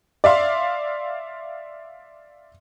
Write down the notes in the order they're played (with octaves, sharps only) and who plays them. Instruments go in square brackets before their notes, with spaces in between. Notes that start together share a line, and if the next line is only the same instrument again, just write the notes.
[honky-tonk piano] D5 E5 F5 C6